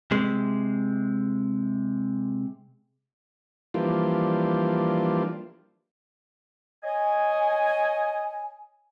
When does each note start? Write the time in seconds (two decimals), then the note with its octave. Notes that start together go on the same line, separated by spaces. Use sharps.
0.11 C3 G#3
3.74 E3 F3 G3 A#3 D4 F4
6.83 C#5 D#5 G#5